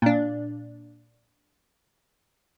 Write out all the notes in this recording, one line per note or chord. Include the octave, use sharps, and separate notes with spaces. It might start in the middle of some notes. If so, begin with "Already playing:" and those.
A#2 D4